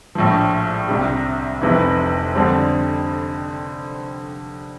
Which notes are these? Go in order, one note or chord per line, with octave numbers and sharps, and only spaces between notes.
A#1 A2 F3
C2 C3 G3
F1 F2 C3 E3
F2 D3 G3 C4